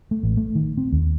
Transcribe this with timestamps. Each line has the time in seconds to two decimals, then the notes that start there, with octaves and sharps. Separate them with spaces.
0.11 A3
0.23 A1
0.37 A3
0.55 D#3
0.77 C4
0.92 D#2